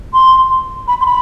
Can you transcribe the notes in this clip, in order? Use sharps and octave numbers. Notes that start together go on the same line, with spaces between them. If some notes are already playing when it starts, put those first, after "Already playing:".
C6
B5
C6
B5